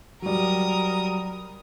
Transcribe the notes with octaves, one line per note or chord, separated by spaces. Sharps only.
F#3 G3 A#4 D#6